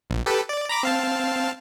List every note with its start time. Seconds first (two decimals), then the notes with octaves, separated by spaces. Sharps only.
0.10 A#1
0.26 G4 A4 B4
0.49 D5
0.69 A#5 B5 D6
0.83 C4 F5 A5